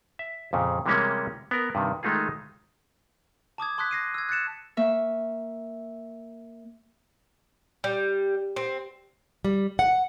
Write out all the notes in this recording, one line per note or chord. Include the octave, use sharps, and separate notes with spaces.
E5
F2 A#2 C#3
C3 E3 G3 G#3 A#3 C#4
B3 A#4
G2 C3 D#3
D#3 G#3 A3 D#4 F4 G#4
A5 D6 D#6 G#6
A5 C6 D#6 F#6 G#6 B6
A#6 C7 D#7
E6 G#6
F#6 A6 C#7 E7
A#3 E5 C#6
G3
C4
G3
F#5